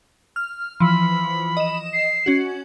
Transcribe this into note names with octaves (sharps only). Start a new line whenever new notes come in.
F6
E3 F3 B5
D#5 E7
C7
C#4 F#4